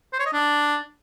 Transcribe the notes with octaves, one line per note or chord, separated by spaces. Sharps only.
C5
C#5
D#5
D4